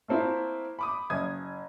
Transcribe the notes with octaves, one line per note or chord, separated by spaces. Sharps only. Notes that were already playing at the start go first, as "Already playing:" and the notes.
A3 A#3 C4 E4
B5 D6 D#6
F#1 D#6 G#6